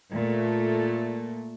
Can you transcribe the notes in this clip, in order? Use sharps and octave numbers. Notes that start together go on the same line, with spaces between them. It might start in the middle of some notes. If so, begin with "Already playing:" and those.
A#2 A3